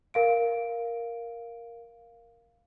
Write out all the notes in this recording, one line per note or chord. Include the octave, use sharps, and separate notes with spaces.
A#4 F5 D7